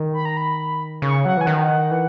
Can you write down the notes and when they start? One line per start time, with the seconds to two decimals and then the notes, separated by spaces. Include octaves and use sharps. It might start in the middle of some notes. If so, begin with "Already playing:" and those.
Already playing: D#3
0.14 B5
0.25 A#5
0.37 B5
1.02 C#3 C#6
1.25 F#3 F#5
1.37 E3 G#5
1.46 D#3 F#5
1.91 E3